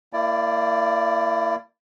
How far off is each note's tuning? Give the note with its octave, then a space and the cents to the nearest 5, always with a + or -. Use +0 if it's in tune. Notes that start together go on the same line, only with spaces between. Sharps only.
A#3 -25 E4 +25 D5 +0